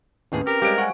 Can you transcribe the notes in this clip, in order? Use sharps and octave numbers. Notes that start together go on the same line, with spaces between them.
D#2 A2 C4 C#4 G#4 B4
G4 A#4
G3 G#3 G4 C5 F5 D7
F#5 G#5 C#6